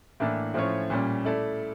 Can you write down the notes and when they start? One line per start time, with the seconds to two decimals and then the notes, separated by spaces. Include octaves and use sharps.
0.20 A2 E3 A#3 D4 A4
0.54 A2 F3 C#4 F4 C#5
0.90 A#2 G3 C#4
1.25 A3 E4 A4 D5